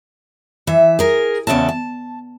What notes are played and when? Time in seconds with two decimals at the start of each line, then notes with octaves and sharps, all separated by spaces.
0.67 E3 E5
0.99 G#4 A#4
1.47 E2 C#3 C#4 E5 A5
1.69 A5